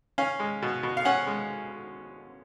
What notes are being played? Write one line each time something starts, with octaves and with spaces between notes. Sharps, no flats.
C#4 F5
G#3
B2
B2
F5
C#4 F#5
G#3